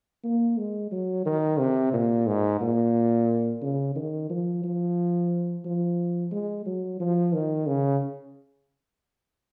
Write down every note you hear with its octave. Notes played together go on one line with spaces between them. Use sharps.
A#3
G#3
F#3
D#3
C3
A#2
G#2
A#2
C#3
D#3
F3
F3
F3
G#3
F#3
F3
D#3
C#3